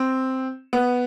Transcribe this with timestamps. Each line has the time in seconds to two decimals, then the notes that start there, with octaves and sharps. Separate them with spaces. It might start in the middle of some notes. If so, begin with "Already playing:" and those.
Already playing: C4
0.73 B3